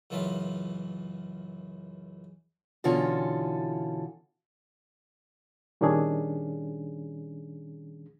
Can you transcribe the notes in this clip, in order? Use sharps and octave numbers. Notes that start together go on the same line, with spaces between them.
C#2 F#2 E3 F#3 F4 E5
B2 D3 E3 C#4 F4 A4
A#2 D#3 G3 C#4 D4 G#4